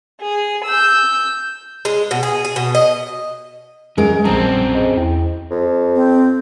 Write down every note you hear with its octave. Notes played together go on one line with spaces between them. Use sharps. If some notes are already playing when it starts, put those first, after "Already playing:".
G#4
E6 G6
G#3
B2
G#4
G#4
B2
D#5
F#2 G#3 A#4
A#1 F#2 G3 C4 A5 A#5
G#4 C5 D#5
E2 E4 G5
F2
C4